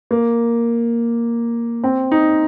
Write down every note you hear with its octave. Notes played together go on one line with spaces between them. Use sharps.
A#3
C4
D#4